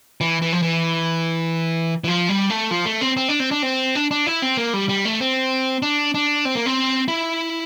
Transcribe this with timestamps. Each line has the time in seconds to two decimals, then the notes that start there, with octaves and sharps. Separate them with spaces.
0.21 E3
0.42 E3
0.53 F3
0.62 E3
2.04 E3
2.08 F3
2.29 G3
2.50 A3
2.71 F3
2.86 A3
3.01 C4
3.17 C4
3.29 D4
3.40 C4
3.51 D4
3.63 C4
3.95 D4
4.11 D4
4.26 E4
4.42 C4
4.57 A#3
4.73 G3
4.89 G3
5.05 A3
5.21 C4
5.82 D4
6.14 D4
6.45 C4
6.55 A#3
6.66 C4
7.08 E4